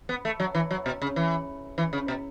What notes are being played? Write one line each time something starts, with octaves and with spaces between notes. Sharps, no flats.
B3
A3
F#3
E3
F#3
B2
C#3
E3
E3
C#3
B2